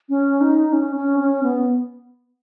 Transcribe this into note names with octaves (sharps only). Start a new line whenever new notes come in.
C#4
D#4
C#4
C#4
C#4
B3